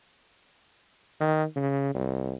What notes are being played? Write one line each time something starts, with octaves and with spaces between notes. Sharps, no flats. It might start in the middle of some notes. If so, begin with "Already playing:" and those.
D#3
C#3
C2